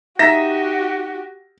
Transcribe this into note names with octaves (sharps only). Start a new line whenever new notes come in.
D#4 F#4 G4 E5 A#6